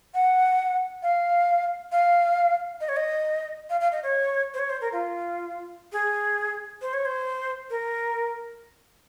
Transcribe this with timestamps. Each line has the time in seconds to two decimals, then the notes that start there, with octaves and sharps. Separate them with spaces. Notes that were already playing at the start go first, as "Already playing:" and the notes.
0.14 F#5
1.03 F5
1.92 F5
2.81 D#5
2.89 C#5
2.96 D#5
3.70 F5
3.81 F5
3.92 D#5
4.03 C#5
4.54 C5
4.59 C#5
4.70 C5
4.81 A#4
4.93 F4
5.92 G#4
6.82 C5
6.93 C#5
7.06 C5
7.70 A#4